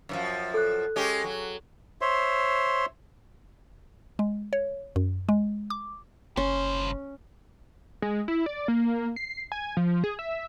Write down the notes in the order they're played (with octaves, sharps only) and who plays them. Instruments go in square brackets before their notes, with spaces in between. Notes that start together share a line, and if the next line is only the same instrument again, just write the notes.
[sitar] F#2 E3 F3
[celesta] A4 F#6
[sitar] G#3 C#4 G4
F#3
[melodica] C5 C#5 E5 C6
[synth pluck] G#3
C#5
F#2
G#3
D6
[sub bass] F#1 [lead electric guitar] G2 C5 [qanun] C#4
[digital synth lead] G#3
E4
D5
A#3
C7
G#5
F3
G#4
E5